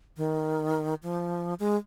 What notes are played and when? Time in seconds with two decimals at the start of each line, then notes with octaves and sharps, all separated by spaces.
0.17 D#3
1.03 F3
1.59 G#3